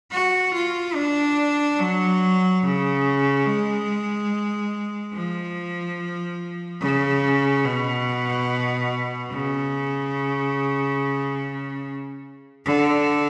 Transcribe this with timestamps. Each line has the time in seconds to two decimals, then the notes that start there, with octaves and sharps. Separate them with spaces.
0.11 F#4
0.54 F4
0.94 D4
1.79 F#3
2.63 C#3
3.46 G#3
5.13 F3
6.81 C#3
7.64 B2
9.32 C#3
12.65 D3